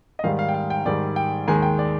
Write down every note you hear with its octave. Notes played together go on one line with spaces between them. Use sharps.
D#5
G#2 D#3 G3 F5
F5
G5
F5
G5
G#2 D#3 G3 D5
G5
D#2 D#3 G#3 G#5
G5
D5